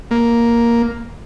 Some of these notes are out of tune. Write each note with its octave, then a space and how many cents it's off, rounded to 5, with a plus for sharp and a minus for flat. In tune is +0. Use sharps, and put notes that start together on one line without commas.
A#3 +5